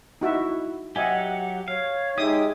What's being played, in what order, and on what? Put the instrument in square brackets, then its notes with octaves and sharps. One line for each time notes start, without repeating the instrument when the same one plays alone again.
[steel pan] D#4 F#4 E5 [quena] E4
[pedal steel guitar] F#3 G4 [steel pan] D#5 E5 G#5 [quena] F#5
[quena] C#5 [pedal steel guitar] F5
[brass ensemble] G#3 D#4 [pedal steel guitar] G4 [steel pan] E5 D#6